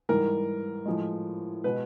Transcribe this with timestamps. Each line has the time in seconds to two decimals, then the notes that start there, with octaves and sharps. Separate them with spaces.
0.09 G#2 E3 G3 A#4
0.85 A2 F3 G#3
1.64 B2 G#3 B4